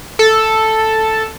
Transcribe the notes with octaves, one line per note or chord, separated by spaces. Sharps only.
A4